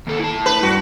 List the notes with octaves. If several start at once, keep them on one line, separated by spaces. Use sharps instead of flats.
D#2 A4
E4 A5
B4
G2 F#4